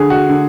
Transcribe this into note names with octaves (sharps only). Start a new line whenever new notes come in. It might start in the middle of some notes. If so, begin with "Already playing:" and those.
Already playing: D3 G#4
F#4
D3